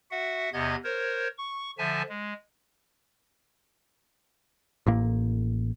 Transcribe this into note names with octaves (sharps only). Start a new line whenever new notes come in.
F#4 E5 F#5
E2 C3 B3 D#5 G#6
A#4 C5 C#5
C#6
D3 F3 E5 G#5 A5
G#3
A1 A2 A#3